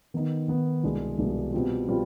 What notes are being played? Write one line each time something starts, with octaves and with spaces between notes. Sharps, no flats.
D#3 B3 D#4
D#3 B3 D#4
C2 B2 G#3 D4
C2 B2 G#3 D4
B2 G3 C4 F4
B2 G3 C4 F4